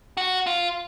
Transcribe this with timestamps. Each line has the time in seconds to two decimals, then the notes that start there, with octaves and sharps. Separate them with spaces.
0.17 F#4
0.47 F4